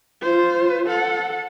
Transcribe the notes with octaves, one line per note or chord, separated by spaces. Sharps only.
F4 C5
A4 F#5